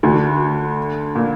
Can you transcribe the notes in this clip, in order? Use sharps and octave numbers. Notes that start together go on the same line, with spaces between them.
D2 D3
A#2